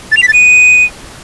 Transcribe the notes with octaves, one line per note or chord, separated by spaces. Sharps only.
A6
F7
B6
A6
D#7